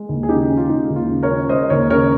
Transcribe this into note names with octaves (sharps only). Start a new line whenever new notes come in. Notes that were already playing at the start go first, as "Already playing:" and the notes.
Already playing: G#3
D#2
G#4
C#3 D#4 G4
C#4
F4
G#3 D#4
D#2
F4
C#3
A#4 C#5
C#4
G#3 C5 D#5
D#2 A#4 C#5
C#3 A#4 C#5